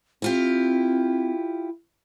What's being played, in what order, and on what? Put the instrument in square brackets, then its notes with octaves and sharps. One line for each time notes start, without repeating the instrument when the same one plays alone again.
[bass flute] C4 [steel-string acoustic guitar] E4 F4 G4